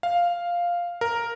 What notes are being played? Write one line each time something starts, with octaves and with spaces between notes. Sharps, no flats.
F5
A#4